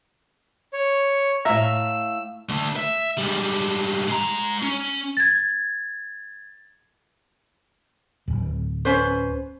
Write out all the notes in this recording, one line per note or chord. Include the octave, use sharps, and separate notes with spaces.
C#5
A2 E5 F5 A#5 E6
D3 A3
E5
G#2 G3
G#3 A#5
C#4
G#6 A6
D1
C#4 B4 C5